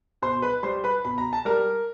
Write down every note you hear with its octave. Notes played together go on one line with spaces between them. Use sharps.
B2 C5 C6
B4 B5
G3 C5 C6
B4 B5
B2 B5
A#5
A5
G3 A#4 A#5